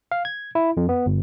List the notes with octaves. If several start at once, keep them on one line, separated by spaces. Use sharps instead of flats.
F5
G#6
E4
F2
B3
G1